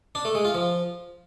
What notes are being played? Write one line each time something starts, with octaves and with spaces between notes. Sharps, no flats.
D4
A3
G#3
F4
F3